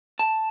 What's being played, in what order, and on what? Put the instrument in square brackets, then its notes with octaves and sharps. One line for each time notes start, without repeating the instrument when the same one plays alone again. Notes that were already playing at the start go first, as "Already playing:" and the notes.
[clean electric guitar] A5